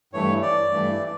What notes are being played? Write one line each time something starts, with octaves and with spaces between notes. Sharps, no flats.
G2 E3 A3 C#5
D5
G2 E3 A3